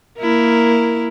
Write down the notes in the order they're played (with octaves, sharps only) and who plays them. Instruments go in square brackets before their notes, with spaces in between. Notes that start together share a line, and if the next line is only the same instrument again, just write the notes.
[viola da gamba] A#3 E4 A#4